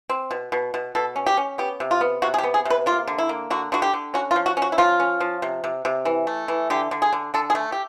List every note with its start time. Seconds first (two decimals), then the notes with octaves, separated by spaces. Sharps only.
0.09 C4
0.31 B2
0.52 B2
0.74 B2
0.95 B2 A4
1.16 C#4
1.26 G4
1.37 C#4
1.58 B3 G4
1.80 C3
1.91 F4
2.01 B3
2.22 C3 F#4
2.34 G#4
2.38 G4
2.44 B3
2.54 G#4
2.65 C3 B4
2.86 A#3 F4
3.08 D3
3.18 E4
3.29 A#3
3.50 D3 F#4
3.72 D3 F#4
3.82 G4
3.93 D3
4.14 C#4 F#4
4.31 F4
4.36 F3
4.46 F#4
4.57 C#4
4.62 F#4
4.72 E4
4.78 F3 F4
5.00 C#4
5.20 F3
5.42 C3
5.64 C3
5.85 C3
6.05 E3
6.27 A3
6.48 E3
6.70 D3 G4
6.91 D3
7.02 G#4
7.13 D3
7.34 D3 A4
7.50 G#4
7.55 A3
7.72 G4